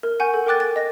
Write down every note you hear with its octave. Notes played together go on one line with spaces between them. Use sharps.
A#4
F#5 G#5 C#6 G6
A4
A#4 G5 D6 F#6 A6
A6
D#5 A#6